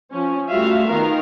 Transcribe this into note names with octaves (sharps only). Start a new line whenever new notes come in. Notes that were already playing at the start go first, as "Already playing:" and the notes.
F3 C#4
G3 A3 F4 F#4 E5 F5
D#3 B3 A#4 F5